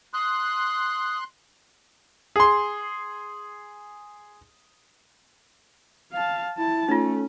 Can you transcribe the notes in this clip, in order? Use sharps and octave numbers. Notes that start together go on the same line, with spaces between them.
C6 D#6 F#6
G#4 C6
F5 A5
E4 A5
A3 C#4 D#4 F4